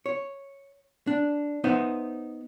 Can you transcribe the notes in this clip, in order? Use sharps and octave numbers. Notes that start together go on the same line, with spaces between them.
C#5
D4
B3 D#4 C5 E5